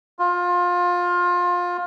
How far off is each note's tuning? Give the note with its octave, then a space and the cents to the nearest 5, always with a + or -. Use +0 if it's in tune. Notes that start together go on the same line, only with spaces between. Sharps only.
F4 +20